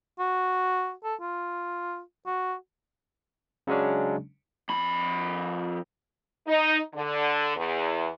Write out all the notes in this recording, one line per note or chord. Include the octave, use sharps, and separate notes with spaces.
F#4
A4
F4
F#4
C#3 F#3 G#3 C#4 D4
F2 B5
D#4
D3
E2